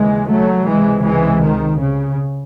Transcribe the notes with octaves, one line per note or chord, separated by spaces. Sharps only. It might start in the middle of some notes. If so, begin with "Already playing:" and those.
Already playing: D#2 C#3 E3 G#3
F#3 A3
C#2 C3 E3 G#3
E3 G#3
D#3
C#3